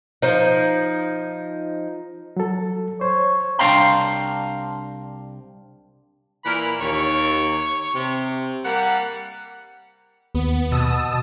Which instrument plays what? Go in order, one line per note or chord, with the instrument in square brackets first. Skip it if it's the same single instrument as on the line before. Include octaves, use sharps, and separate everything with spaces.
[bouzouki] F3 D#4
[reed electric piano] F#3 A4
[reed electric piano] C5 [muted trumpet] C#5
[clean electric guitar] C2 D4 F5 G5 A#5 C6
[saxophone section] A#2 E3 A#4 [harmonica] B5
[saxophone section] D#2 [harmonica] C#5 C#6
[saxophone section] C3
[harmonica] G3 [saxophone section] A#3 F#5
[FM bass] D#2 [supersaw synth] B3
[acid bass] B2 [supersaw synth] A5 D#6 E6